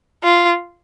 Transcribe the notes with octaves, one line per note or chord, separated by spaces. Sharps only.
F4